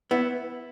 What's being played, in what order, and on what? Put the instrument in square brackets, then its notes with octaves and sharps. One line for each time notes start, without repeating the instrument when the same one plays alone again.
[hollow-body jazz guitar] B3 E4